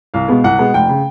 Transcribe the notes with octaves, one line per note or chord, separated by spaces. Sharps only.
C2 F5
B2 G#3 B3
C2 F#5
B2 G#3 B3
F1 G5
C#3